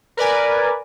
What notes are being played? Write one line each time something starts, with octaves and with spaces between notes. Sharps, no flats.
A#4 B4 D5 G#5